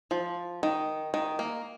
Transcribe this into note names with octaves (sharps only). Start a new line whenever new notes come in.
F3
D#3
D#3
A#3